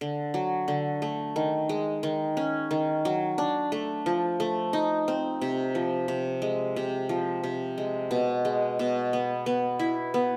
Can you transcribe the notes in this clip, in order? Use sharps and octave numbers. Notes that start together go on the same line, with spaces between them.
D3
F#3
D3
A3
D#3
G#3
D#3
C#4
D#3
F#3
D4
A3
F3
A3
D#4
C4
C3
F3
C3
G#3
C3
F3
C3
G#3
B2
G#3
B2
B3
B3
E4
B3